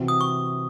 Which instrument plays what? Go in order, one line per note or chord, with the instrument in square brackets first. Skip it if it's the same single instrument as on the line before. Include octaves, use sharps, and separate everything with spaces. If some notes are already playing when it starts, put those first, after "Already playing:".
Already playing: [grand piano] C3 E3 C4 F#4
[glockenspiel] D#6
C#6